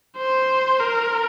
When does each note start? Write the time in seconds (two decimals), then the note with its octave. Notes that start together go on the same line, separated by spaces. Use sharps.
0.17 C5
0.80 A#4